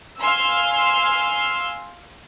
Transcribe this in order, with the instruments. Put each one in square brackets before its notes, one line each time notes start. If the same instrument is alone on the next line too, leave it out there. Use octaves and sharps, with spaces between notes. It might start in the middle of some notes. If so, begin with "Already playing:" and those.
[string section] F5 G#5 C6 E6